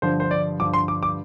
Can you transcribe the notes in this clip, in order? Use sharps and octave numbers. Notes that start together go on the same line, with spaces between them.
G2 D3 F3 C5
C5
D5
G2 D3 F3 D6
C6
D6
D6